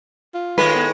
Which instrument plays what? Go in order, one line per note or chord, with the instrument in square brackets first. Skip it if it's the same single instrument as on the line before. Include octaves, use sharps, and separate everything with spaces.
[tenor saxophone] F4
[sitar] A2 D#3 G#3 [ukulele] B4
[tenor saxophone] B3